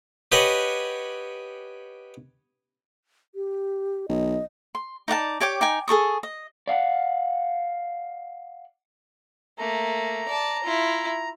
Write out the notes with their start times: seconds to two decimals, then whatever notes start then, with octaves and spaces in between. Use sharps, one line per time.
0.32 G4 B4 C#5 D#5 F#5 G#5
3.35 G4
4.09 B1 D#5
4.75 C6
5.08 D#4 D5 F#5 A5
5.40 G4 C#5 G5 D6
5.61 D#4 G5 G#5
5.88 G#4 A4 C#6 D#6
6.23 D#5
6.68 D5 F5 F#5
9.58 A3 A#3 A#5
10.28 D5 A5
10.64 E4 F4